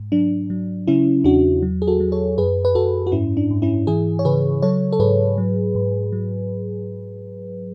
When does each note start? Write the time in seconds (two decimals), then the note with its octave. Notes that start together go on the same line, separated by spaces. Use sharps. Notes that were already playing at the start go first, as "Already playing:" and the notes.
Already playing: G#2
0.12 F#3 D4
0.50 F#3
0.87 C#3 C#4 E4
1.24 E2 D4 F#4
1.62 F#3
1.82 G#4
1.87 F#4 A4
2.00 F#3
2.12 A4 C#5
2.38 F#2 G#4 B4
2.65 B4
2.75 F#2 F#4 A4
3.07 F#4
3.12 G#2 C#4 E4
3.37 D4
3.50 G#2
3.62 C#4 E4
3.87 E3 E4 G#4
4.19 C#5
4.25 C#3 G#4 B4
4.62 F#3 A4 C#5
4.92 A4
4.99 G#2 G#4 B4
5.38 F#3
5.75 G#2
6.12 F#3